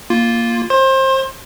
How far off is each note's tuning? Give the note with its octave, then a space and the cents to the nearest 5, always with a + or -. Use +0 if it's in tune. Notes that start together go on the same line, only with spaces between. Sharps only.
A#3 +0 F4 +0
C5 +25 C6 +30